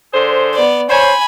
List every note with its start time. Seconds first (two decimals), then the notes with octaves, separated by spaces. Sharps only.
0.13 D3 G#4 C5
0.55 B3 D5
0.90 C5 C#5 G#5 B5